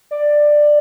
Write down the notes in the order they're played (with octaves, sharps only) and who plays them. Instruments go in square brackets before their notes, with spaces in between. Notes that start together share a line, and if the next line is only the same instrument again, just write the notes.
[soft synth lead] D5